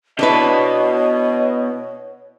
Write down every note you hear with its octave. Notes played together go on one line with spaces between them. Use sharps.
B2 D4 E4 B4 C#5 D#5